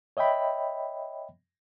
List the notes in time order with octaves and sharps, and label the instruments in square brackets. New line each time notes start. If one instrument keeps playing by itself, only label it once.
[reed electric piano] C#5 D#5 E5 G5 B5